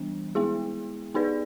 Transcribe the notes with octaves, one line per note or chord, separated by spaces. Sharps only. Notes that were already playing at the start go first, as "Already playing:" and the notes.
Already playing: E3 G3 B3 D4
G#3 B3 E4 G#4
B3 D#4 G#4 B4 D5